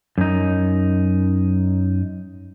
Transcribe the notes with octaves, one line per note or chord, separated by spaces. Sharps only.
F#2 D#4